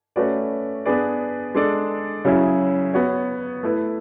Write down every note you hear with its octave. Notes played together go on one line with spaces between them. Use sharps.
A3 C#4 F#4 B4 D5
B3 D4 G#4 B4 D5
G#3 D4 A4 D5
C#3 F#3 C#4 E4 G#4
B3 F#4 C#5
A3 E4 B4